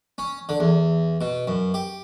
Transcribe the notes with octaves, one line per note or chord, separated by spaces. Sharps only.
C#4
D3
E2
B2
F#2
G4